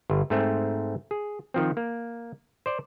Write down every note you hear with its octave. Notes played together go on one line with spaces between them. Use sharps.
G1
G#2 A3 C4
G#4
D#3 F3 C4
A#3
C5 D5